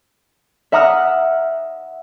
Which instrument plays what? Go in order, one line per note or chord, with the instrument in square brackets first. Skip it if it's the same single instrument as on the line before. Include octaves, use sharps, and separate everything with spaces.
[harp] E5 F#5 A#5 D#6 F6 F#6